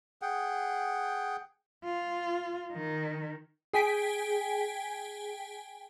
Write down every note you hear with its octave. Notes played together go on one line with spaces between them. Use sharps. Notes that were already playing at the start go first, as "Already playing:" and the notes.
G#4 F#5 G5
F4
D#3
G#4 G5 G#5 B6 D7